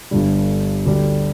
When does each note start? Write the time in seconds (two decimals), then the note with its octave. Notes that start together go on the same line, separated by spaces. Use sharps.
0.11 G1 G2 D3 G3
0.86 D2 D3 G3 D4 G4